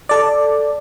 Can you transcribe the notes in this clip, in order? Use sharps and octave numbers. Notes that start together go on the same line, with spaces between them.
A4 D5